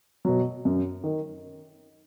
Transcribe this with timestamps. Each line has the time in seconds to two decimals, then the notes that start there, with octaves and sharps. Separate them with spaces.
0.25 B2 F#3
0.65 F#2
1.04 D#3